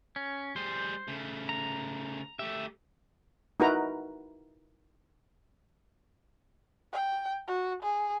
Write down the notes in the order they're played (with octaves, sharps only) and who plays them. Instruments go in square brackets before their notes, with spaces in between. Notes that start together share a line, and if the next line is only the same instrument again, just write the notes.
[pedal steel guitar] C#4
[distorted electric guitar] G3 G#4 [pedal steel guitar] C5
[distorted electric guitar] C#3 A3
[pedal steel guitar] A#5
[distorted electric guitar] A3 G4 [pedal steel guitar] E5
[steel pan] D#4 E4 F#4 A#4 B4 A#5
[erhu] G5
F#4
G#4